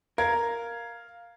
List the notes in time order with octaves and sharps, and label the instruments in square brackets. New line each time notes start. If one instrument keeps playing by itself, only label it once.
[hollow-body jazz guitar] A#4 [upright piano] F5 G#6